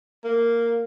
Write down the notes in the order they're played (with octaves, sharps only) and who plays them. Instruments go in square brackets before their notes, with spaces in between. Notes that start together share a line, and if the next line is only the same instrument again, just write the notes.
[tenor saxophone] A#3